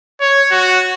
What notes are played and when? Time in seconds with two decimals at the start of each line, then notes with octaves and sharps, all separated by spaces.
0.21 C#5
0.51 F#4